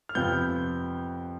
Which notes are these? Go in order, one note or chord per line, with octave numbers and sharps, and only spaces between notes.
F6
F2 C3 F3 B3 G6